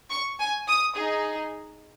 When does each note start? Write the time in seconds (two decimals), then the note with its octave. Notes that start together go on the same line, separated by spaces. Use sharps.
0.11 C#6
0.40 G#5
0.68 D#6
0.96 D#4 G#4